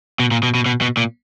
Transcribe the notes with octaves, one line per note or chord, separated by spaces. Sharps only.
B2
A#2
B2
B2
B2
B2
A#2